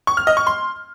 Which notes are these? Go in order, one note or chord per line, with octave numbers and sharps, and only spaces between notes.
C#6
F6
D#5
C#6
C6